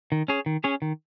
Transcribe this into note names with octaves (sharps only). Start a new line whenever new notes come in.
D#3
C#4 G#4 C#5
D#3
C#4 G#4 C#5
D#3